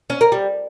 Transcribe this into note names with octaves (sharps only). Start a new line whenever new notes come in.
C#4
A#4
G3